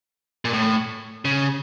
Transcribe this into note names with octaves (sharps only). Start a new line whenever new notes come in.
A#2
A2
C#3